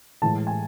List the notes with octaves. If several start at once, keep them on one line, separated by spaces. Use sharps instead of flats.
A2 E3 G#3 A5
G#5